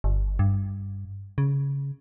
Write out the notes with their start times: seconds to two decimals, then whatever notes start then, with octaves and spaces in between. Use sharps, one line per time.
0.04 G1
0.39 G2
1.38 C#3